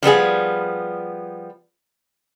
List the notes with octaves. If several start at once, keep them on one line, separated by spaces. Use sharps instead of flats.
F3 G3 B3 G#4